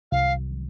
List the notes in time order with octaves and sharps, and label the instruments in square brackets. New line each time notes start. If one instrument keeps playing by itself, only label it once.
[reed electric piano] C2 [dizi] F5